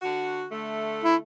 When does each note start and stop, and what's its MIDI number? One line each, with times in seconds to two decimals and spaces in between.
0.02 0.45 50
0.02 0.45 66
0.51 1.19 50
0.51 1.19 57
1.04 1.16 64